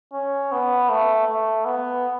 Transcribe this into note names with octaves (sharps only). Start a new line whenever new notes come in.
C#4
B3
A3
A3
B3